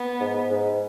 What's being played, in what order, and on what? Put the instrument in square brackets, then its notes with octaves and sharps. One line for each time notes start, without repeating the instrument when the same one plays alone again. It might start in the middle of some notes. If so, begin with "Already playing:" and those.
Already playing: [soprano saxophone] B3
[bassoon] G#2
G#2